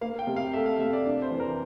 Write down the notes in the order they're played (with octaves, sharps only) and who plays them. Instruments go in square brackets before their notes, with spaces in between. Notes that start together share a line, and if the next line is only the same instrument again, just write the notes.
[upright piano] A#3 [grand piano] F5
[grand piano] G5
[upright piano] C3
[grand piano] F5
[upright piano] A3 [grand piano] E5
[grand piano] F5
[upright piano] C3 [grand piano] E5
[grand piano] D5
[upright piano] D4 [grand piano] D5
[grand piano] C5
[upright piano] E3
[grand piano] A#4